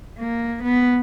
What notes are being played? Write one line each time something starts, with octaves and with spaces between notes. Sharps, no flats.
A#3
B3